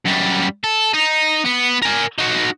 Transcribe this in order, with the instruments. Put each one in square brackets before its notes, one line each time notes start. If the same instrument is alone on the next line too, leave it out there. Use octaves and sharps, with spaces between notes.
[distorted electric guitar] F#2 G3
A4
D#4
B3
A#4 G#5
D#4 F#4